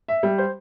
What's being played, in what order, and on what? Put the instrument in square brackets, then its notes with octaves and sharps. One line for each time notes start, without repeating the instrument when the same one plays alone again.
[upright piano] E5
G3
C5